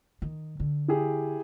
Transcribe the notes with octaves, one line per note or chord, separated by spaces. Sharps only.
D#3
D3
E4 G4 G#4